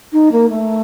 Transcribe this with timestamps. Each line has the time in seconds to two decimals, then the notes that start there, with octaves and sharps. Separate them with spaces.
0.12 D#4
0.31 A#3
0.49 A3